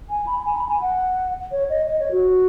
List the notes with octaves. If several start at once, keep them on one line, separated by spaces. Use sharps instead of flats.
G#5
B5
G#5
B5
G#5
F#5
C#5
D#5
D#5
C#5
F#4